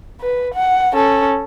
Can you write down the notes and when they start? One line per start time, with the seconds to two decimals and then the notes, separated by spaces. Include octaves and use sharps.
0.21 B4
0.54 F#5
0.94 C#4 A4